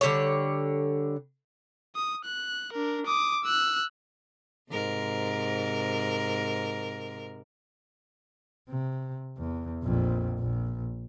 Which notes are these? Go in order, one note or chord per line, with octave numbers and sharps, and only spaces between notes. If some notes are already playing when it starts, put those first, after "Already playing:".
D3 G3 B3 C#5
D#6
F#6
D4 A#4
D6 D#6
E6 F#6
G#2 C3 A#4
C3
E2
A#1 F2
A#1